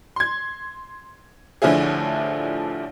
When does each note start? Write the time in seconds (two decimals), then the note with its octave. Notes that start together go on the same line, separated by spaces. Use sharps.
0.16 C6 G#6
1.62 A1 D3 F3 D4 E4 G#4